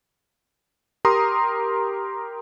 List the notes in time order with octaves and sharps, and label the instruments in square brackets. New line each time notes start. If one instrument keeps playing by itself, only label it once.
[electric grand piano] G4 A#4 A#5 C6 D#6